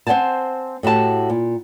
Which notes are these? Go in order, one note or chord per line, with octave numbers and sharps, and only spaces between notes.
C4 C5 D5 F#5 G#5 A5
A2 F#4 G4 A5
A#2